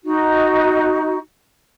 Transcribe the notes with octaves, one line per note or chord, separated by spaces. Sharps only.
D#4 F#4